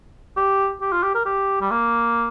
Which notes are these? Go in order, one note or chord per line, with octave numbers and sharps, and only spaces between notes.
G4
G4
F4
G4
A#4
G4
G3
A#3